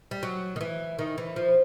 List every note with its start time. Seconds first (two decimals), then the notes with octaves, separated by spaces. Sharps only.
0.11 G3
0.23 F#3
0.56 D#3
0.61 E3
0.99 D#3
1.18 E3
1.36 F3